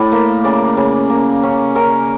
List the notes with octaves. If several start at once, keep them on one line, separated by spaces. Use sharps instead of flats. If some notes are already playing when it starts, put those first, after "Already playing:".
Already playing: A2 D5
A#3 E5
C#3 D5
C#3
A#3
C#4
C#4 A#4